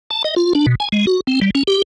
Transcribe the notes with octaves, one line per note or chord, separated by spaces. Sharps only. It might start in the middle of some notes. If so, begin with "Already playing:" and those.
A5
D#5
F4
D4
B2
G#5
G#3
F#4
C4
G3
C#4
G4